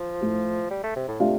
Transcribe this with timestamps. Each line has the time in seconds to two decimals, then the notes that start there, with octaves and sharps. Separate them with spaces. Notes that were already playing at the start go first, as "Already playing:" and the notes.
Already playing: F3
0.21 A2 A3 F4
0.71 G3
0.84 A3
0.96 C3
1.08 A2
1.20 C3 A3 D4 F4